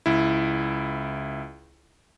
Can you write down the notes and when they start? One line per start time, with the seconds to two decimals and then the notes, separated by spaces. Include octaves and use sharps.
0.06 C#2 E4